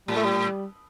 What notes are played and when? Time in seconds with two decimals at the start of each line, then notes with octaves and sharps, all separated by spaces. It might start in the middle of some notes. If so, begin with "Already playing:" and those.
0.08 A2 G3
0.16 A3
0.24 G3